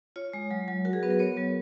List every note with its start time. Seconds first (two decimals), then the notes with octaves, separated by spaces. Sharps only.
0.16 F4 C#5
0.33 G#3
0.51 F#3
0.68 F#3
0.85 F#4 A#4
0.93 G#4
1.03 B3 B4
1.11 A#4
1.19 B3 C#5
1.37 F#3